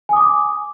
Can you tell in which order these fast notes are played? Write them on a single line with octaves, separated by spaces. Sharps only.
G#5 D#6 D6